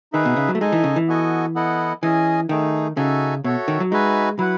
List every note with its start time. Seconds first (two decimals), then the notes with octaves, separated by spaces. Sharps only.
0.13 D#3 D#4 G#4 B4 E5
0.25 B2
0.36 C#3
0.48 F#3
0.55 A3
0.61 G#3 D#4 A4 D#5 G#5
0.72 E3
0.84 C#3
0.96 E3
1.08 B3 F#4 A4 D#5 G#5
1.55 B3 E4 A4 D#5 F#5
2.03 E3 C#4 G#4 D#5 G#5
2.49 D#3 A3 D#4 G#4
2.97 C#3 D#4 F#4 A4 E5 G#5
3.44 B2 F#4 A4 C#5 E5
3.68 D#3
3.80 F#3
3.91 G#3 D#4 F#4 B4 E5 G#5
4.38 F#3 E4 B4 F#5